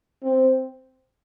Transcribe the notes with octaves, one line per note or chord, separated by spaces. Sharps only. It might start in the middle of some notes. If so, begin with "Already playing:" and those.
C4